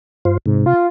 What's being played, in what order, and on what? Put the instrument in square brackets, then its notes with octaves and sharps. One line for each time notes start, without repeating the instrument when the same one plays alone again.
[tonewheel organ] G2 F4 C5
[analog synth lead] G#2 [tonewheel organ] C3
[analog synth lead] F4